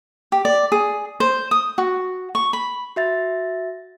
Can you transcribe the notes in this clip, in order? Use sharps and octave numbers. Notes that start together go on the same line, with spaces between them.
G4
D5
G#4
C5
D#6
F#4
C#6
B5
F#4 E5 A6